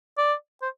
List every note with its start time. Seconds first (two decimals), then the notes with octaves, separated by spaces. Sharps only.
0.18 D5
0.62 C5